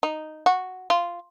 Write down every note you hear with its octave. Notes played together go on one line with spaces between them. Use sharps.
D#4
F#4
F4